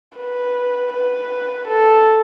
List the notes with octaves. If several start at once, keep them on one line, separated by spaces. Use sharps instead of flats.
B4
B4
A4